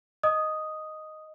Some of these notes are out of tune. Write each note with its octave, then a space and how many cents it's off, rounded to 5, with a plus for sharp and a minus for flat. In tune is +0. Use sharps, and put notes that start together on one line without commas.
D#5 +0 D#6 +0